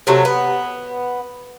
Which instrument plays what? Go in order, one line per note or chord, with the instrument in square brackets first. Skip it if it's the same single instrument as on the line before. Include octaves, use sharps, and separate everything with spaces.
[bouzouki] C3 F#3 A3
B3